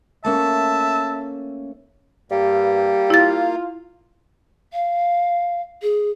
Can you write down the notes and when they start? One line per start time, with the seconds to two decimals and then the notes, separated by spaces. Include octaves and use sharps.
0.25 A3 A#3 C#4 E5 A5
2.31 G2 G3 A#3
3.10 E4 F4 A6
4.72 F5
5.82 G#4